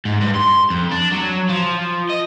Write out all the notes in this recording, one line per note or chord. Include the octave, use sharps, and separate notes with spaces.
G#2
G2
C6
F2
D4
F#3
F3
D#5